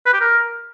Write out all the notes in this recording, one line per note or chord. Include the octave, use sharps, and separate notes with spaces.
B4
G4
A#4